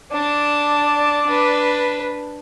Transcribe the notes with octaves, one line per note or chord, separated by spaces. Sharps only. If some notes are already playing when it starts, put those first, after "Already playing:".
D4 D5 A5
D4 B4